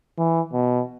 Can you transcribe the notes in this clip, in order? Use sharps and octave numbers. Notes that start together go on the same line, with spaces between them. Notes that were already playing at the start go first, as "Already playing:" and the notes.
E3
B2